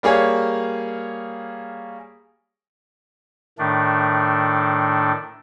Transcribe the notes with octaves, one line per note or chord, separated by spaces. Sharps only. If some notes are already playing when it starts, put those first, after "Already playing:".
G3 A#3 G#4 C#5 F5
A2 D#3 A3 D4